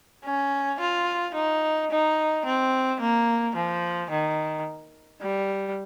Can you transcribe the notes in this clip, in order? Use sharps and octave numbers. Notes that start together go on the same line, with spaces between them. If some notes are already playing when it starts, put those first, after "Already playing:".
C#4
F4
D#4
D#4
C4
A#3
F3
D#3
G3